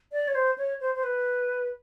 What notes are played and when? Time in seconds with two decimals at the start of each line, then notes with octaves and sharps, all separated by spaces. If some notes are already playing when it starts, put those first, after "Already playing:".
0.12 D5
0.28 C#5
0.35 C5
0.58 C#5
0.81 C5
0.95 C5
1.04 B4